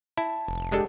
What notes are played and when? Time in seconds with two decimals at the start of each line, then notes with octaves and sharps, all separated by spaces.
0.18 E4 A5
0.48 F1
0.72 G#3 D4 G4 A4